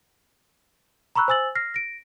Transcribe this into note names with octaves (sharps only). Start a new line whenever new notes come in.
A#5 B5 C#6 E6 F#6
C5 G#5 E6 A6 F#7
F6 A#6 C7
A#6 D7